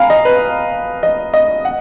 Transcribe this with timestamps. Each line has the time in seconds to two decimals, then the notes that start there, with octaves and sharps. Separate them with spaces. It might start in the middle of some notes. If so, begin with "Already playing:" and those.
Already playing: F5 G#5 A#5 B5
0.10 D#5
0.25 B4
1.03 D#5
1.34 D#5
1.65 F#5